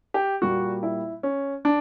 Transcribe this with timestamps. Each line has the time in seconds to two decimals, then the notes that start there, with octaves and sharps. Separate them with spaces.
0.14 G4
0.42 A#2 G3 A#3 F#4
0.83 E4
1.23 C#4
1.65 D4